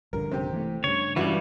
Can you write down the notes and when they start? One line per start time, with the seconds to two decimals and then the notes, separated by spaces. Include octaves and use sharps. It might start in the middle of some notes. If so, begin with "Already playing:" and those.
0.13 A#1 G2 D3 A#4
0.31 C3 G4
0.53 E3 A3
0.84 G2 C#3 C#5
1.16 C#2 E3 G3 F#4 E5